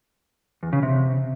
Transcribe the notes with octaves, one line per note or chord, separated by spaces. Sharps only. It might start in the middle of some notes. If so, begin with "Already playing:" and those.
E2
C#3
C3